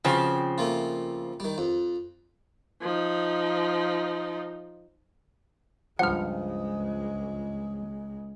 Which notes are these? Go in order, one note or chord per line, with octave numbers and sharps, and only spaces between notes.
C#3 F3 C4 F#4 B4
A3 A#3 F4
D#3 G3
F2
F3 D#4
C#2 G2 F3 G#3 F#5 F6